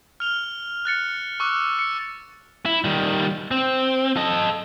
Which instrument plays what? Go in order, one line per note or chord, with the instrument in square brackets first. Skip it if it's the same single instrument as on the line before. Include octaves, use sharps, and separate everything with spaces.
[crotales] F6 F7 G7
F#6 A6 C#7
C#6 D6 E6 F#6
C#7
[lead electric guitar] E4
D#3 G3
C4
A4 D#5